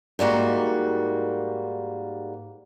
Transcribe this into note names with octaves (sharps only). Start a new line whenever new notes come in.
G#2 G3 A#3 F#4